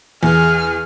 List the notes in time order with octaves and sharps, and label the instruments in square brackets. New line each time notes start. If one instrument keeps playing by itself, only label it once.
[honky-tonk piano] E2 [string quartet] G#4 F6